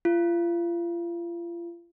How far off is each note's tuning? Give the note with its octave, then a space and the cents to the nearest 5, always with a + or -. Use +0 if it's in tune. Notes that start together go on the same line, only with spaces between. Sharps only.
F4 -35